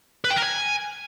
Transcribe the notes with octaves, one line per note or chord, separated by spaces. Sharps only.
B4
G5
A#4
G#5